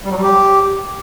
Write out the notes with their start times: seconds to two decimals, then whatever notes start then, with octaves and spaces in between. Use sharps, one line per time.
0.05 G3
0.11 F#3
0.16 G3
0.22 G4